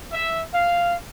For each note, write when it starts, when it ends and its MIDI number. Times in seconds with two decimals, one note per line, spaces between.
0.12 0.42 76
0.54 0.95 77